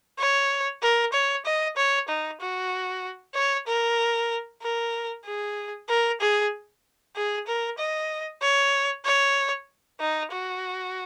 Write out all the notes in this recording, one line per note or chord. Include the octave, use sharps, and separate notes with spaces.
C#5
A#4
C#5
D#5
C#5
D#4
F#4
C#5
A#4
A#4
G#4
A#4
G#4
G#4
A#4
D#5
C#5
C#5
D#4
F#4